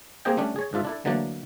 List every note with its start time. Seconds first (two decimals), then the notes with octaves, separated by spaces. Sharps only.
0.25 A#3 C4 G4 G#4 D#5 G5
0.37 G3 A3 C#4 D4
0.56 G#4 C#5
0.73 G#2 D4 F4 E5
0.85 D4 E4 A4
1.05 D3 E3 F#3 A3 A#3 D4